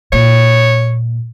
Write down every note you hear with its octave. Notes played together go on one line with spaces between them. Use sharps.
A#2 C#5